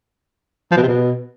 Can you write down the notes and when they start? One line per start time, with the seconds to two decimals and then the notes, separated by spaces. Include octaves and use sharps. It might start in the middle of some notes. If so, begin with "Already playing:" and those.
0.71 F3
0.77 B2
0.82 C3
0.88 B2